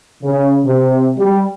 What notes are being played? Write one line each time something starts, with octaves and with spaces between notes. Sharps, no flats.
C#3
C3
G3